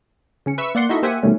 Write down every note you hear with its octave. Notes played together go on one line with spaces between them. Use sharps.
C#3 C#4 C#7
B4 E5 C#6 E6
A#3 D5 F#5 C6 C#7
D#4 E4 F#4 A4 D#5 E5
A#3 G4 C5 E5 F#5 G#5
B2 D#3 G3 A3 C#4